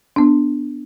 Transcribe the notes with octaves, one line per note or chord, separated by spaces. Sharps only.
B3 D4